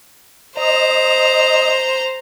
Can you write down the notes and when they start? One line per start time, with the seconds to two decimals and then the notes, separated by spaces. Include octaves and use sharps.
0.57 C5 D#5 A#5